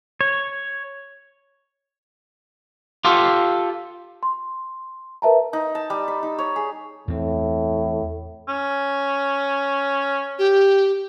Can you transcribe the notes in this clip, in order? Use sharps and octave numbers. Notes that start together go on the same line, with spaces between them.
C#5
F4 G4 A4
C6
A#4 B4 E5 A5 A#5
D#4
A5
G3
B5
D#4
C#5
G#4
E2 A2 C4
C#4
G4